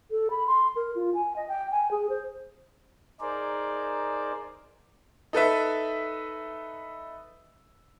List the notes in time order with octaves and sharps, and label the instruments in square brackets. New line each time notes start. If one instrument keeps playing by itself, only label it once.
[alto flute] A4
B5
C6
A#4
F4
G#5
D#5
G5
G#5
G#4
C5
[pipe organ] D#4 G#4 A#4 C5 D5
[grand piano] D#4 A4 B4 E5